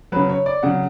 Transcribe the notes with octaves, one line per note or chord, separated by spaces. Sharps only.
C#3 F#3 B4
C#5
D5
C#3 F#3 F#5